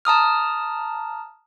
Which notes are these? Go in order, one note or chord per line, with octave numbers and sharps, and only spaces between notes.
A5 A#5 D#6 F6